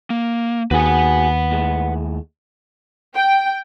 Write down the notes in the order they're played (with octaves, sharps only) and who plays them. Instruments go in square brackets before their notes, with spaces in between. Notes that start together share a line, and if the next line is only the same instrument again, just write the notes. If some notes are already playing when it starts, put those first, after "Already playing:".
[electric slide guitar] A#3
[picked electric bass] D#2 [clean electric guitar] F#4 G#4 [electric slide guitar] B4 F#5
[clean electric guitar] A2 G#3
[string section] G5